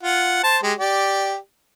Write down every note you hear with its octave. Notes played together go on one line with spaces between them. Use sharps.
F4 F#5
C5 A5
G#3 G4
G4 D5